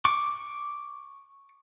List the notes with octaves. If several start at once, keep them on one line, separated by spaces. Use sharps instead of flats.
C#6 D6